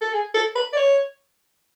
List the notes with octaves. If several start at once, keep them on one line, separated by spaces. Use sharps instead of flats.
A4
G#4
A4
B4
D5
C#5